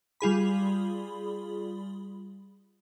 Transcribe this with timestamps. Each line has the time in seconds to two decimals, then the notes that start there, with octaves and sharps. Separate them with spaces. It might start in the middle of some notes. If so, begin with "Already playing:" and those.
0.20 G3 F4 G#4 B5